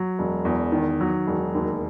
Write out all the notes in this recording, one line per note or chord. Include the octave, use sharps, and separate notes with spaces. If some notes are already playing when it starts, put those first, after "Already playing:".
Already playing: F#3
E1
E2
D#3
F#3
E1
D#2